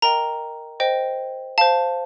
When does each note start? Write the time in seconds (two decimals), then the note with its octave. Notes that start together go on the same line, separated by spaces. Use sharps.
0.02 A#4 D#5 G5 A#5
0.80 C5 D#5 G5
1.58 C5 F5 A5